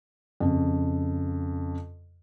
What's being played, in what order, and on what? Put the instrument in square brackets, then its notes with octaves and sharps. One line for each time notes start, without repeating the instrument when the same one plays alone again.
[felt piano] F2 C#3